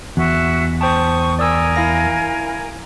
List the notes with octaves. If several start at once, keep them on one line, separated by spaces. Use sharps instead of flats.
E2 F#4 E5 F#6
C5 G5 A5 C#6 D#6
A#4 D5 G#5 D#6 E6
E4 F5 A#6